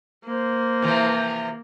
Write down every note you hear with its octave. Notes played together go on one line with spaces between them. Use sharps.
A#3 C5
C3 E3 F3